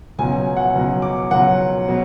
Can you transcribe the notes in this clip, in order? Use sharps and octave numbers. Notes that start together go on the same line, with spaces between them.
C#2 B2 F#3 G#5
F#5
C#2 B2 F#3
D6
C#2 B2 F#3 F#5
B2 F#3